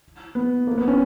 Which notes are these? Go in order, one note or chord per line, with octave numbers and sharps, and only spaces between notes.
B3
A#3
B3
C#4